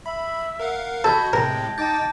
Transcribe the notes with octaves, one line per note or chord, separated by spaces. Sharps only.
E5 B5
A#4 F5 F#5
F#4 A4 D#5 A5 B5 G6 G#6
A2 C3 G#3 A#4 G5 A#6
D#4 G5 A5 D6 G6 A6